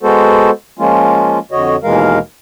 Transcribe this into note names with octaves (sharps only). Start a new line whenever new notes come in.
G#3 B3 F#4 A4 C5
F3 G#3 A#3 C#4 F4
F2 D3 F#4 C#5 D#5
D#2 B2 E3 G#3 A#4 F5